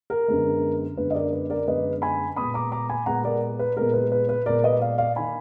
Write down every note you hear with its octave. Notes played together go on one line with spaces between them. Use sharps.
A#4
F#2 D3 G#3 B3
F#2 D3 G#3 B3 B4
D#5
A#4 D5
B4
A#4 D5
F#2 D3 G#3 B3 B4 D#5
G#5 B5
A#2 G#3 B3 B5 D#6
A#5 D6
A#5 D6
G#5 B5
A#2 G#3 B3 F#5 A#5
A#4 D5
B4
A#2 G#3 B3 A#4
B4
B4
B4
A#2 G#3 B3 A#4 D5
B4 D#5
D5 F5
D5 F5
D#3 A#3 G#5 B5